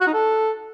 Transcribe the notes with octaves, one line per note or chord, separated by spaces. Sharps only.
F#4
D#4
A4